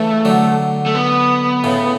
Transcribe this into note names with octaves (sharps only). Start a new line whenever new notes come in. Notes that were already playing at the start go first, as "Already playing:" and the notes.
Already playing: C#3 E3 A3
D3 F#3
A3
B3
A2 C#3